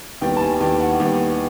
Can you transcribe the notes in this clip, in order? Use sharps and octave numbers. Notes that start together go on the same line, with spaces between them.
D#2 D#3 G3 B3 G5
A5
G#5
D#2 D#3 G3 B3 G5
F#5
D#2 D#3 G3 B3 G5